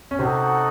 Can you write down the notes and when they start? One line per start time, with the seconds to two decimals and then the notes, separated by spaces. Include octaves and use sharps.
0.11 C#4
0.19 C3 C4 D#4 F#4 A4 D#5 F#5